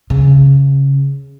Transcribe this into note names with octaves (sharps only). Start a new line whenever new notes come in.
C#3